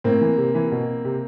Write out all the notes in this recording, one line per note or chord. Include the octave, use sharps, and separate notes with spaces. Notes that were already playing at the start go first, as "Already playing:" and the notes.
A2 A#3 C4
E3
C3
E3
B2
C3